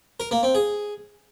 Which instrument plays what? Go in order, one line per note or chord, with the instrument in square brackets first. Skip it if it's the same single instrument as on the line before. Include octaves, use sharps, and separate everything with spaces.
[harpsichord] A#4
A#3
C4
G#4